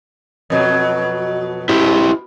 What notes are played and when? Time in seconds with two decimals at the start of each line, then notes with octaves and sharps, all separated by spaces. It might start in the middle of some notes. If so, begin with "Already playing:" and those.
0.50 F2 B2 F#3
1.69 G2 E4 G4